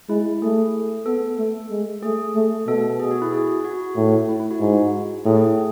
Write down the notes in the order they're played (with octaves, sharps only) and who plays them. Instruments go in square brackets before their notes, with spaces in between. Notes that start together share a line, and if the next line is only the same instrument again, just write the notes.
[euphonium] G#3 [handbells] E4
[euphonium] A3 [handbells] G#4
[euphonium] B3 [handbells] A4
[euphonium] A3
G#3
[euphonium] A3 [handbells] G#4
[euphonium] A3
[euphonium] B2 [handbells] A4
[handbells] G#4
F#4
E4
G#4
F#4
[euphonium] A2
[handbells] E4
E4
F#4
[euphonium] G#2
[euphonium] A2 [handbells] G#4
[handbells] G#4
E4